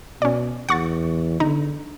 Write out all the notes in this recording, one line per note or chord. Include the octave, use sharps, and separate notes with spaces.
B2 C#4 D5
E2 F#5 C#6 A6
D3 D#4